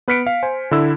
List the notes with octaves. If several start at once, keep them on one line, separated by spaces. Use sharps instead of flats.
B3 B4 F6 B6 C#7 D7
F5
C5 G#5
D3 E4 E6